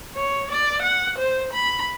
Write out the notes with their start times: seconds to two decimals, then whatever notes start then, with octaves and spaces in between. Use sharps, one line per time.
0.15 C#5
0.51 D5
0.82 F#5
1.18 C5
1.53 B5